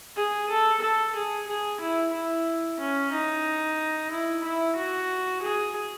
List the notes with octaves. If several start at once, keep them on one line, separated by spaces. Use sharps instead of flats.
G#4
A4
A4
G#4
G#4
E4
E4
C#4
D#4
E4
E4
F#4
G#4